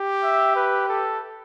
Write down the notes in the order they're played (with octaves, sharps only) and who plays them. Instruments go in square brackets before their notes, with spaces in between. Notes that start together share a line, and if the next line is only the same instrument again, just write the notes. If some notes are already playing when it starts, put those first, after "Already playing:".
Already playing: [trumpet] G4
[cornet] E5
B4
A4